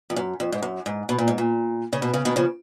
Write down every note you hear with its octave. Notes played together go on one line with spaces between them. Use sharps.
F2
F#2
F2
G#2
F#2
G#2
B2
A#2
G#2
A#2
C#3
B2
C#3
B2 D#3
C#3 F3